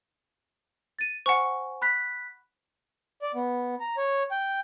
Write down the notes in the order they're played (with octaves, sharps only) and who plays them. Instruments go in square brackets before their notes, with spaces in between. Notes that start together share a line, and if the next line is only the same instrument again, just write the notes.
[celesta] A6 D#7
[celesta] C5 G#5 [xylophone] F#5 C#6
[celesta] B5 F#6 B6
[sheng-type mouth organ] D5
B3
A#5
C#5
G5